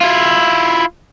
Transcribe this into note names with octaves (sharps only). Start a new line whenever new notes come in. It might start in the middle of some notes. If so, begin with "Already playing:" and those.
E4 F4